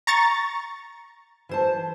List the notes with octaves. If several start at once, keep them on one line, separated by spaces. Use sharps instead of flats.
A#5 C#6 A6
E3 C5 A5